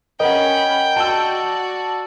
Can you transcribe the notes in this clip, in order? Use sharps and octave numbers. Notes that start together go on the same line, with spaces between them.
C#4 A#4 D#5 F#5 G5 B5
F#4 D5 A5 E6